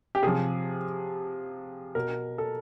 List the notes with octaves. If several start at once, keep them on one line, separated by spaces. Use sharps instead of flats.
G4
C3 F3 G#4
B2 A#4
A4